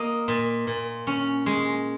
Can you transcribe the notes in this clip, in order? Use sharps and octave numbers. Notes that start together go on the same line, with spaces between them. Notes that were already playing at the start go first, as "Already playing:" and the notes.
Already playing: A#3 D#5
A#2
A#2
C#4
G#3